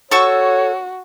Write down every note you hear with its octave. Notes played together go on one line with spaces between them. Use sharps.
F#4 A4 C#5 C#6 E6